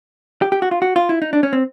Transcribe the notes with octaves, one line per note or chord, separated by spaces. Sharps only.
G4
G4
F#4
F4
F#4
F4
E4
D#4
D4
C#4
C4